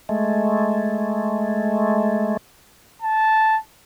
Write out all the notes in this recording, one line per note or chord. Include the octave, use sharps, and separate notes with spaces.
G#3 A3
A5